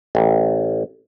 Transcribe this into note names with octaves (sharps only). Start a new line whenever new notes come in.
A1